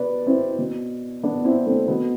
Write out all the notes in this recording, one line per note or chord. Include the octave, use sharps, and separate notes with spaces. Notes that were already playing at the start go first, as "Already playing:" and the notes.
Already playing: B2 B4 D5
C4 E4
B2
B3 D4
C4 E4
A3 C4
B2 B3